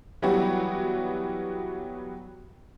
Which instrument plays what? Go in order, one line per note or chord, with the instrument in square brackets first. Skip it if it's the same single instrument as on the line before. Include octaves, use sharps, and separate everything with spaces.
[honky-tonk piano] E3 F#3 G3 B3 F#4 G4